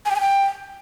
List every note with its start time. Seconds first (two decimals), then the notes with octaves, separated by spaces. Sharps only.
0.06 G#5
0.11 G5
0.16 G#5
0.21 G5